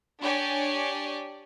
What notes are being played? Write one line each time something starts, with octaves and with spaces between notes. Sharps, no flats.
D4 G4 C#5 D5 G#5